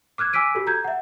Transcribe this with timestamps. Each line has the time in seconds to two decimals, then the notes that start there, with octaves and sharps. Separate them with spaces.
0.18 D6 F6 F#6 G#6
0.33 G#5 D6 E6 B6 D7 D#7
0.55 F#4 G4 A4
0.67 A#5 G6 G#6
0.84 E5 F#5